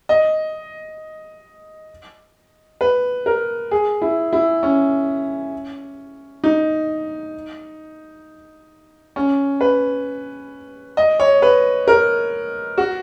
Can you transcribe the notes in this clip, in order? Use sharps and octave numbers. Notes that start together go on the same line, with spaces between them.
D#5
B4
A#4
G#4
E4
E4
C#4
D#4
C#4
B4
D#5
C#5
B4
A#4
F#4